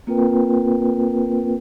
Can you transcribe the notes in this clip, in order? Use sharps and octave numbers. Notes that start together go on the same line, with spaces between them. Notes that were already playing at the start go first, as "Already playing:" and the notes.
A#3 C4 F4 A#4 B4 G5